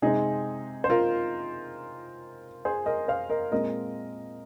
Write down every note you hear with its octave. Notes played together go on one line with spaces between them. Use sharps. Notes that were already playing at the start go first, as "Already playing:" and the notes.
C3 G#3 C4 D#4 G#4
C5
F4 A#4
G#4 C5
A#4 D#5
C5 F5
A#4 D#5
A#2 G#3 C4 A#4 D#5